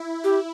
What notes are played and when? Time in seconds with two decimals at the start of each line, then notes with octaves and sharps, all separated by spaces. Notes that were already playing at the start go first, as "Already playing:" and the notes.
Already playing: E4
0.24 G4